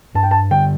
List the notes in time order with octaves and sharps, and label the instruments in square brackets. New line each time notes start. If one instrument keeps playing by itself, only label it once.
[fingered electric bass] G2 [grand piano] A5
[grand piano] G5
A5
[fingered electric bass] D3 [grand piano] G5